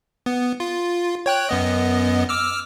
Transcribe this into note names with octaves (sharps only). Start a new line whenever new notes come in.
B3
F4
C#5 G5 F#6
F#2 B3 D#5
D6 E6 F6